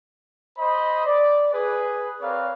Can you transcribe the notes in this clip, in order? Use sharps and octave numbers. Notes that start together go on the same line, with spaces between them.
C5 D#5 B5
D5
G#4 B4
C4 A#4 B4 C#5 D5 F5